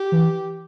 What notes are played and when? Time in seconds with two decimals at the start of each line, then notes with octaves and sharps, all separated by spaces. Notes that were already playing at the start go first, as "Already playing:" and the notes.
Already playing: G4
0.12 E3